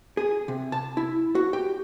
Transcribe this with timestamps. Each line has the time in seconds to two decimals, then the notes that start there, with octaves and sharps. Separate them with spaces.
0.17 G#4
0.48 C3
0.72 A5
0.97 E4
1.35 F#4
1.53 G4